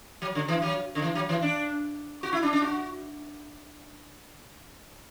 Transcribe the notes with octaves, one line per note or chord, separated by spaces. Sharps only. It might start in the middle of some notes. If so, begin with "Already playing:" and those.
F#3
D3
E3
F#3
D3
E3
F#3
E3
D4
F#4
E4
D4
D4
F#4